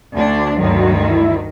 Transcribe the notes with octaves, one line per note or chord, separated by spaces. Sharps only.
D2 D4
D2 G2 D#3 F#3
E4